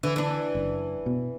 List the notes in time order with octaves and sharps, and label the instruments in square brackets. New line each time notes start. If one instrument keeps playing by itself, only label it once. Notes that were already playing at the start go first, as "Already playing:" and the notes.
[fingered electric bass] D3 [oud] E3
[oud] E3 D4
[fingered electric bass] F#1
B2